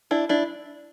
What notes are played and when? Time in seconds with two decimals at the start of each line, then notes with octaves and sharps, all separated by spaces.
0.11 D4 E4
0.29 D4 E4